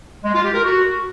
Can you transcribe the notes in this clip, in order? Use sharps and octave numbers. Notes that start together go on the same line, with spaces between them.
G#3
F4
G4
A#4
F#4